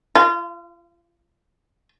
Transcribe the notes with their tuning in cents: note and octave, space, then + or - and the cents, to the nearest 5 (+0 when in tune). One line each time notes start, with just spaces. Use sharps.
F4 -35